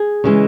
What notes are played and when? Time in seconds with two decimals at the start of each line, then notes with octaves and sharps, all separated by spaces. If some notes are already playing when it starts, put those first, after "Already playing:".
Already playing: G#4
0.24 C#3 E3 G#3